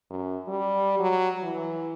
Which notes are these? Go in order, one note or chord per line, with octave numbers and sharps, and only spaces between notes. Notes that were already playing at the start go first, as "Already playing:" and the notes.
F#2
G3
F#3
E3